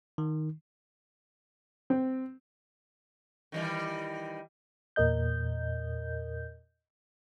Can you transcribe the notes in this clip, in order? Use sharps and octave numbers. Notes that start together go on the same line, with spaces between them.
D#3
C4
D#3 E3 G3
E2 A#2 A#4 D#5 G6